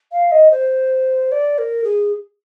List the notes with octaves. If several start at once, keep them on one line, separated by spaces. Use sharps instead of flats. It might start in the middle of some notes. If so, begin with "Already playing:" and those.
F5
D#5
C5
D5
A#4
G#4